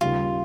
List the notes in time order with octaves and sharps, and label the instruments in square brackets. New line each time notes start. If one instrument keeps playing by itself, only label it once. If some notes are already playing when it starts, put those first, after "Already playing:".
[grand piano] D#2 C#3 G3 [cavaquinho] F4